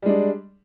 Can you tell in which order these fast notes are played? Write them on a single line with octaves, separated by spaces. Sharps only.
G3 G#3 D4